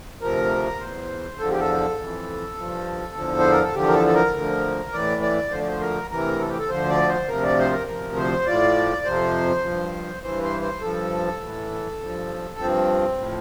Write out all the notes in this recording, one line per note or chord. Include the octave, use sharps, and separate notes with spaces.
D2 C3 F3 A#4
E2 E3 C5
E2 D3 F3 A4
G4
A4
F2 E3
G2 F3
E2 D3 F3
C5
A#4
A4
E2 D3 F3 G4
A#4
A4
A4
A#4
D2 D3 F3
A2 E3 D5
D5
D2 D3 F3 C5
D5
C5
A#4
D2 C3 E3 A#4
A4
G4
A4
D2 D3 F3 C5
D5
C5
D2 C3 F3 A#4
D5
C5
A#4
D2 C3 F3 A#4
C5
A2 F3 D5
F2 C3 F3 C5
G2 F3
G2 E3 C5
C5
C5
G2 F3 A4
A2 E3
G2 F3
G2 F3 C4
A2 F3